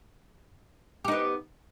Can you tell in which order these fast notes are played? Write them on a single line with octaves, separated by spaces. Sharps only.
G4 D#4 B3